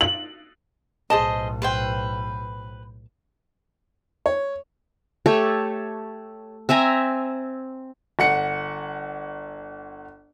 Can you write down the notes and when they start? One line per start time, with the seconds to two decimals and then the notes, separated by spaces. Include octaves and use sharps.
0.01 F#7
1.10 B1 A2 G#4 C5 D#5 A5
1.62 B4 C5 G5
4.26 C#5
5.26 A3 G4 A4 C#5
6.69 C4 E5 G#5 A#5
8.19 G1 F#5 C#7